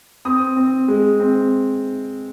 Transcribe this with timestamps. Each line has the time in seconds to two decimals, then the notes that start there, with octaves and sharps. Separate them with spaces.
0.25 C4 D#6
0.56 C4
0.88 G#3
1.20 C4